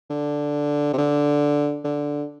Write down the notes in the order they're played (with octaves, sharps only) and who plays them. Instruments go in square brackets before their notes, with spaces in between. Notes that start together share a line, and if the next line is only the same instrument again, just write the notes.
[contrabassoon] D3
C3
D3
D3